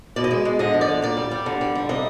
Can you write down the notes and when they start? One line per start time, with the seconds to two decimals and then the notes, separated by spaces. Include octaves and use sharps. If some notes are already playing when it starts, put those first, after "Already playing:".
0.16 B2 D5
0.24 D#5
0.31 G#3 D5
0.45 G#3
0.59 D3 D#5
0.74 F3
0.81 D5
0.89 D3
1.02 A#2 D5
1.17 G3
1.31 G3
1.46 D3
1.61 G3
1.75 G3
1.89 C3 D#5